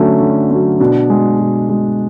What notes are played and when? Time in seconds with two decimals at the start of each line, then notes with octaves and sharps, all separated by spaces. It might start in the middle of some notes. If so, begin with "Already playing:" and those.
Already playing: D3 F#3 A3 C#4
0.21 D3
0.50 F#3 A3
0.80 B2 D4
1.10 G#3
1.39 B2
1.69 G#3